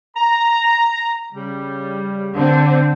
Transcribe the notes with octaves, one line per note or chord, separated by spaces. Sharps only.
A#5
C#3 G3
D3 C4